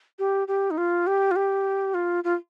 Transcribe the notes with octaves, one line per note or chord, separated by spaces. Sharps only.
G4
G4
D#4
F4
G4
F4
G4
F4
F4